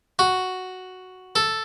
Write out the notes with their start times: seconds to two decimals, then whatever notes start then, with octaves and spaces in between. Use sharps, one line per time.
0.19 F#4
1.36 A4